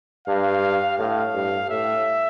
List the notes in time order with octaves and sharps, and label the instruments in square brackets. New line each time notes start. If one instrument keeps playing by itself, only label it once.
[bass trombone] G2 [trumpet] F5
[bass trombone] A2 [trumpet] F5
[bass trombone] G2
[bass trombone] A2 [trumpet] E5